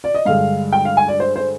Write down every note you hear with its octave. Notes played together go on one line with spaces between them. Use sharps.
D5
D#5
G2 D3 G#3 F5
G5
F5
G#5
D5
C5
C5